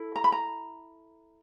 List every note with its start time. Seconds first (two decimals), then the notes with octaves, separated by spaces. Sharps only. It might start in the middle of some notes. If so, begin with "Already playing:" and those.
Already playing: E4 A4
0.16 A#5
0.24 B5
0.32 A#5